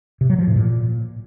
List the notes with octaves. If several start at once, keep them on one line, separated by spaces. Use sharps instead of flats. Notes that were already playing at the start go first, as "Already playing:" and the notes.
C3
F#3
F3
A2
A#2